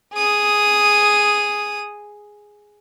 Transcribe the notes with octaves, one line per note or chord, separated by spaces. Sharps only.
G#4 D#6